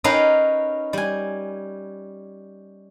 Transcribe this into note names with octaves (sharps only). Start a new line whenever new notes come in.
C#4 D#4 A#4 B4 F5 G5
G3 G#5